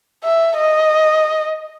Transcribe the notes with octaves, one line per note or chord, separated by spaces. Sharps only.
E5
D#5